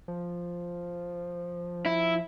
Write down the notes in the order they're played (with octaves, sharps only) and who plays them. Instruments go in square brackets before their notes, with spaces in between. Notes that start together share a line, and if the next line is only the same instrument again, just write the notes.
[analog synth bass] F3
[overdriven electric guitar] E4